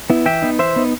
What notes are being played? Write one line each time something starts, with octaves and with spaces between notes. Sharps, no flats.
B3 E4
E3 E5 G5
B3 D#4
E3 C5 E5
B3 D#4